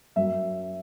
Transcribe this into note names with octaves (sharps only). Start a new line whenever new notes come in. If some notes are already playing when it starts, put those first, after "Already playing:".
F#2 F#3 E5